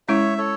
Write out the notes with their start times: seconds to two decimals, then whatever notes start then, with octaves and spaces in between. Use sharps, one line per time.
0.08 G#3 C#4 E4 C#5 E5
0.38 A4 C#5